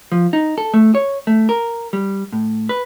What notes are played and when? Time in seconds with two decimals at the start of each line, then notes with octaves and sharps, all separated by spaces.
0.12 F3
0.33 D#4
0.58 A4
0.74 A3
0.95 C#5
1.27 A3
1.49 A#4
1.93 G3
2.32 A2
2.69 B4